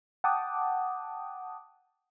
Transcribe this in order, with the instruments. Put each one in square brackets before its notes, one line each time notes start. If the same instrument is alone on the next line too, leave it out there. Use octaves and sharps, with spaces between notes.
[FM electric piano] F#5 G5 A5 D6 D#6